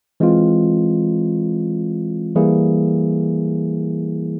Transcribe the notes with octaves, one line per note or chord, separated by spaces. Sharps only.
E3 G#3 C4 F4
E3 G3 A#3 E4 G#4